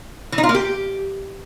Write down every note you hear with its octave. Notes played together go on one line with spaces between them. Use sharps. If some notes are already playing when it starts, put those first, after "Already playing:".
E3
D#4
F4
A#3
G4